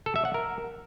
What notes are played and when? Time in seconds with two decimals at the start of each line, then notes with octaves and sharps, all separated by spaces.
0.06 A4
0.16 E5
0.25 F#5
0.34 A#4